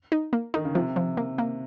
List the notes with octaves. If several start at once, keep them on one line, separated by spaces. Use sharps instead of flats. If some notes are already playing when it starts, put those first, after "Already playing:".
D#4
A#3
D#3 D#4
C#3
C3 F3
F3
A#3
A#3